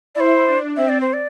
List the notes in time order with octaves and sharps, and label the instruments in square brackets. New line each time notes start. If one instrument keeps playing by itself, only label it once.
[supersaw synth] E4 [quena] C5 D5
[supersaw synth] D4
[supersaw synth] C4 [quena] E5
[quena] D5
C5
D5